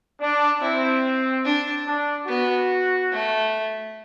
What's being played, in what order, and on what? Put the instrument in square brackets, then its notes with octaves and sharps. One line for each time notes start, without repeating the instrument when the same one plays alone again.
[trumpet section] D4
[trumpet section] C4 [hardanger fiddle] E4
[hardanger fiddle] D4
[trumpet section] D4
[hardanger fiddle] B3 [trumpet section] F#4
[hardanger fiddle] A3